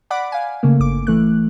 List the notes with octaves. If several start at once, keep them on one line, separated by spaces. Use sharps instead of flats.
D5 F#5 B5 D6
F5 G#5
C#3 A3 A#3
G1 D6
E3 A3 F#6